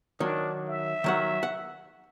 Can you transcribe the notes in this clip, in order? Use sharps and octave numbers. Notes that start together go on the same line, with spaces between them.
D#3 F#3 D4
E5
D#3 F#3 F#5
F#5